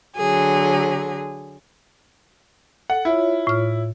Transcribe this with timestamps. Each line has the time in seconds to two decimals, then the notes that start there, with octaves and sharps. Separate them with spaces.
0.16 D3 F#3 G#4
2.90 A4 F#5
3.05 E4 F4 C#5
3.47 A2 F6